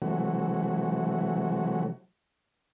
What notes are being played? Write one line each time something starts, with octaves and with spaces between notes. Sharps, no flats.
C3 E3 F#3 G#3 A3 F#4